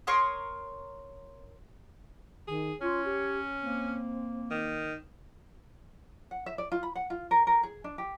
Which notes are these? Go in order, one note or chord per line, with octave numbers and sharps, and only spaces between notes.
A#4 C#5 C6 D#6
D#3 G#4
C#4 F4 C#5
G4
A#3 C4
D#3
F#5
E5
D5
F4
B5
F#5
F4
A#4
A#4
G#4
D4
G4